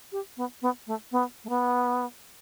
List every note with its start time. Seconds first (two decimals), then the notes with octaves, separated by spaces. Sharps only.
0.12 G4
0.37 B3
0.62 B3
0.87 A3
1.12 B3
1.44 A3
1.49 B3